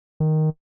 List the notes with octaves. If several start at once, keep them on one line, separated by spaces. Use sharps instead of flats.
D#3